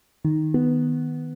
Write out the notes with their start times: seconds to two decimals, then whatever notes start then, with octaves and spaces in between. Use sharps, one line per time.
0.24 D#3
0.54 B3